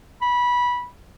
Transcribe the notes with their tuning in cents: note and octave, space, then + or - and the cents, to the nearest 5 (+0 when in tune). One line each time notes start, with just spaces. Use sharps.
B5 -15